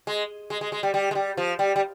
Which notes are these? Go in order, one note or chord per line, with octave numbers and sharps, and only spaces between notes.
G#3
G#3
G#3
G#3
G3
G3
G#3
G3
F3
G3
G3